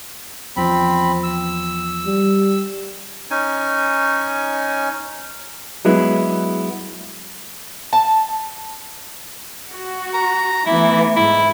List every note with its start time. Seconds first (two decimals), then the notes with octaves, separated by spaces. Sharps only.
0.57 E2 F3 C4 B5
1.23 E6
2.06 G3
3.31 C#4 D#4 G#5
5.85 F#3 G#3 B3 E4
7.93 A5
9.71 F#4
10.14 A#5
10.66 E3 A3 B3 E4
11.16 G#2 E4